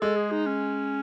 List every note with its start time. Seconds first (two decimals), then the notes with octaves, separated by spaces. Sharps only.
0.01 G#3 A4
0.16 G#4
0.31 D#4
0.46 C#4